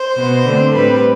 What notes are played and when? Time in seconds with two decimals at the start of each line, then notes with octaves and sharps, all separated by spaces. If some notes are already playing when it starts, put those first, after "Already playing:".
Already playing: C5
0.17 B2 B3
0.45 D3 A3 C4
0.73 A2 G3 C4 B4